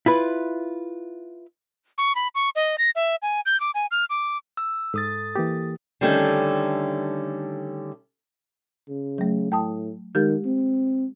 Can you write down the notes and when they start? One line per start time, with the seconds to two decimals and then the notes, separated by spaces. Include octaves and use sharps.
0.06 E4 F4 B4
1.98 C#6
2.15 B5
2.35 C#6
2.56 D#5
2.78 A#6
2.95 E5
3.22 G#5
3.46 G6
3.60 D6
3.75 G#5
3.91 F6
4.10 D6
4.57 E6
4.94 G#2 A4 D#6 A6
5.36 E3 A#3 G4
6.01 D3 D#3 G3 A3 C#4
8.89 C#3
9.18 F#3 A3
9.52 A2 G5 A5 D#6
10.15 D#3 G#3 G4 G6
10.45 C4